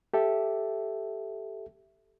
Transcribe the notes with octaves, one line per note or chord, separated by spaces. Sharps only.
G4 A4 E5